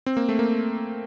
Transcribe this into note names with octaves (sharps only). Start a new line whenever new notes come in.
C4
A#3
A3
A#3